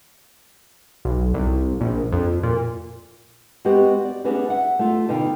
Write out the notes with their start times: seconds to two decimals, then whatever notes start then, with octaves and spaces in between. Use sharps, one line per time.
1.05 B1
1.34 C2
1.80 A#1
2.12 F2
2.43 A#2
3.65 G#3 B3 C4 F#4 G4
4.05 D5
4.24 A3 C#4 D4 F#4 G#4 B4
4.49 E5 F#5
4.79 A3 F4
5.08 B2 D3 D#4 F5 G5